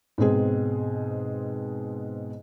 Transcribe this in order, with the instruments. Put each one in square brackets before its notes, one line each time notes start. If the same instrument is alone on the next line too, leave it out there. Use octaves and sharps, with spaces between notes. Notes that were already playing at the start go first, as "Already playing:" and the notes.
[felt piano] G#2 B2 C4 G#4